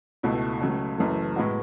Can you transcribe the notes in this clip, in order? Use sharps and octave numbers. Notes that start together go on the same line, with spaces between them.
C#2 B2 A3 E4
C#2 C#3 F#3 A3
F#1 F#2 E3 A3
A2 G#3 B3 F#4